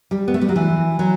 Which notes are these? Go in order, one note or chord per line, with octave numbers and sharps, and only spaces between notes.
G3
B3
A3
G3
F#3
E3
F#3